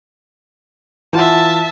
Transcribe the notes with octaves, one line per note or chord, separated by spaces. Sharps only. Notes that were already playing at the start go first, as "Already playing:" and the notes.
E3 F4 E5 F#5 A5